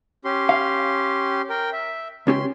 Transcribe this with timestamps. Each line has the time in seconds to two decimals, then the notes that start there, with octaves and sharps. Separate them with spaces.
0.25 C#4 G4 C6
0.49 F5
1.50 A#4 G5
1.73 E5
2.27 C#2 C#4 G4 C6